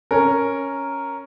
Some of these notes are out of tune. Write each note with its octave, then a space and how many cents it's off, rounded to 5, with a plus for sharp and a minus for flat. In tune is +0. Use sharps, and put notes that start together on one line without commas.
C#4 +0 A#4 +0